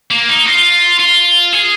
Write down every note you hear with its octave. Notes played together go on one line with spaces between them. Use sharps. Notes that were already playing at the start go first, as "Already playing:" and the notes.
A#3
D#4
F4
F4
G#4